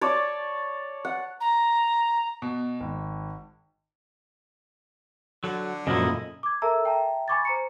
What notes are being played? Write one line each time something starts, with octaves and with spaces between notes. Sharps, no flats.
C#5 D5 A5
F#5
A#5
B2
G#1
D3 F#3
F#2 A#2 C#3 F3 E4 D#5
D6 G#6
A4 A#4 E5 A5 A#5 E6
E5 G5 A5 A#5
G#5 B5 C#6 D6 G#6 A6
C5 A#5 C#7